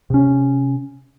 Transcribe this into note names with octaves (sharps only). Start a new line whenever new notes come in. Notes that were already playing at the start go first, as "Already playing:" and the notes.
C3 C#4